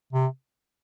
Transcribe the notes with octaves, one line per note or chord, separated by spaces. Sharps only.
C3